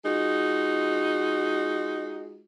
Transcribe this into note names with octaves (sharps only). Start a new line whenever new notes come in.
G#3 D#4 F4 F#4